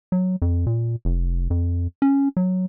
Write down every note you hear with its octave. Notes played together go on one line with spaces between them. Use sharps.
F#3
F2
A#2
F1
F2
C#4
F#3